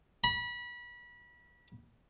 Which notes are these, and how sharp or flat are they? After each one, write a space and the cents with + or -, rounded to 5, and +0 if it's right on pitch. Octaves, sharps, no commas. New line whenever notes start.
B5 -30